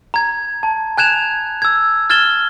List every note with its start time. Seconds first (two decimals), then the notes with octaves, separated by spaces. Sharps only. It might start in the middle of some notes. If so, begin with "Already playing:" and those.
0.14 A#5 G#6
0.63 A5
0.97 G#5 F#6 G#6 E7 F7
1.62 E6 G#6
2.10 F6 G#6 A6 E7 G7